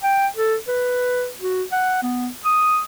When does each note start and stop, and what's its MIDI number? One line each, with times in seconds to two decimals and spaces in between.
0.03 0.27 79
0.37 0.57 69
0.68 1.29 71
1.41 1.63 66
1.72 2.01 78
2.03 2.28 59
2.45 2.81 87